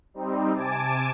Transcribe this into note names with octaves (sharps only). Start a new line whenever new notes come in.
G3 C4 D#4
C3 G#5 A5 D6